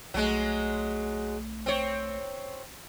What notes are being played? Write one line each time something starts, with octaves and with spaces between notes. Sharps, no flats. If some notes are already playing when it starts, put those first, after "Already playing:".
B1 F#3 G#3 A3
C4 C#5